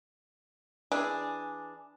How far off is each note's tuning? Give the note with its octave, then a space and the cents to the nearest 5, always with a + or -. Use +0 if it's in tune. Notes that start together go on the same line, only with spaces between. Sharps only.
E3 +0 D4 +0 G#4 +0